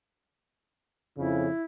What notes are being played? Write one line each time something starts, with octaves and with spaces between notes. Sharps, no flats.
F2 C#3 E4